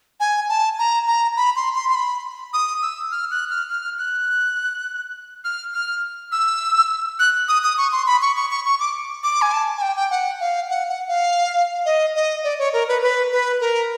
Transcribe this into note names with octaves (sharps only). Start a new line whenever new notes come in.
G#5
A5
A#5
A#5
B5
C6
C6
C6
B5
D#6
E6
F6
F#6
F6
F6
F#6
F6
F6
E6
F#6
D#6
D#6
C#6
C6
B5
C#6
C#6
C#6
C#6
D6
D6
G#5
A5
G#5
G5
G5
F#5
F5
F#5
F#5
F5
D#5
D#5
D5
C#5
A#4
B4
B4
B4
A#4